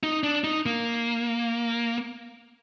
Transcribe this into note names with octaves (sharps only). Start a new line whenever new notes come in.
D#4
D4
D#4
A#3